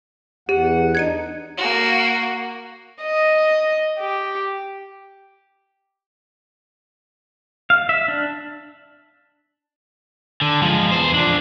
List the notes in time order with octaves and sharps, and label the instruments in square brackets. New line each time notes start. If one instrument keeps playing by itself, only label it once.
[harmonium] E2 F#5 [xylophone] G4
[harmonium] D3 D#4 [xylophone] G#6 C#7 D#7
[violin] A#3 F#4
D#5
G4
[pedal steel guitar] F5
E5
D4
[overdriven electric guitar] D3
F3 G#3
E2 C5
F3 D4